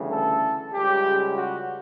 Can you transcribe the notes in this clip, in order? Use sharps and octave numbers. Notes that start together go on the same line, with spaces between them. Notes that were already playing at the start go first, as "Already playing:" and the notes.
Already playing: D2 C#3 E3 G3
A4
C#2 C#3 G3 G4
F#4